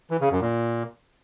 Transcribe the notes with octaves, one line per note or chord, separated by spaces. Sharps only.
E3
C#3
F#2
A#2